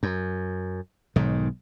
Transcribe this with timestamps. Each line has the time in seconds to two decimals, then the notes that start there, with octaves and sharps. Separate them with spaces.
0.03 F#2
1.16 B1 G#2 D#3